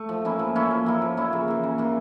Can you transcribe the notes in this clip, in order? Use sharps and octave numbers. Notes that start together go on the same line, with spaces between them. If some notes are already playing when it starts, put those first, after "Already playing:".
Already playing: A3
F3
A#3 C#4 E4
F3
A#3 C#4 E4
F3
A#3 C#4 E4
F3
A#3 C#4 E4
C#3
E3 A#3
C#3
E3 A#3